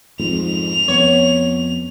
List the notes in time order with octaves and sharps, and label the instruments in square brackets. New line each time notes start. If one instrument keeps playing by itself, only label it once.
[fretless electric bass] F2 G#2 [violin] F7
[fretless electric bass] F2 B3 [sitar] C#5